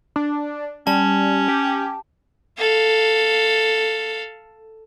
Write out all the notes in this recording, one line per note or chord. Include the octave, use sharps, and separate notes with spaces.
D4
G3 C#4 A5
G4
A4 F5